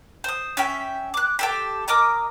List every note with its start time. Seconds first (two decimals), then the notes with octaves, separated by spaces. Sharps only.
0.24 C5 D#6
0.57 C#4 E5 G5
1.14 D6 F#6
1.39 G4 A4 G5
1.88 A#4 D#5 D6 D#6